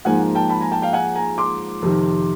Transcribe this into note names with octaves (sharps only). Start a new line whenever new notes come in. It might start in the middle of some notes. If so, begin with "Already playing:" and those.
G#2 F3 A#3 D#4 F#5 G#5
G5 A5
A5 B5
G#5 A#5
G5 A5
F5 G5
F#5 G#5
G#5 A#5
C6 D6
F2 C3 D#3